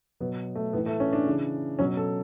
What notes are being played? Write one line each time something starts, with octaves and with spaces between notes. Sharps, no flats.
B2 F#3 B3
A3
A2 E3 B3
A3
C#4
D4
C#3 E3
B2 F#3 C#4
A4